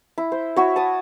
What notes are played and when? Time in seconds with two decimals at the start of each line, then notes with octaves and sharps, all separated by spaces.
0.18 E4
0.32 C5
0.56 E4 F#4 C#5
0.76 A5 D#6